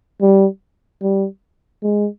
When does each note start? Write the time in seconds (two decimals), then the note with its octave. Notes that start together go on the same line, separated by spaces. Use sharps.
0.22 G3
1.02 G3
1.83 G#3